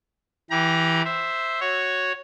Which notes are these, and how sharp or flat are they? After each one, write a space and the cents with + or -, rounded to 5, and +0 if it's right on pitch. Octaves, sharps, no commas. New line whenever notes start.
E3 -5 G4 +0 A#5 +30
C5 +0 E5 +0
F#4 +0 C#5 +0